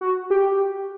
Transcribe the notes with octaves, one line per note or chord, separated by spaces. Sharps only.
F#4
G4